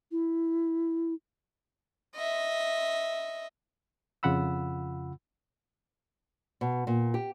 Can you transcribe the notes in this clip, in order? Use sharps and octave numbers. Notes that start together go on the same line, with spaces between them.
E4
D#5 E5
F2 C#3 F4 F#5 B5 E6
B2
A#2
G4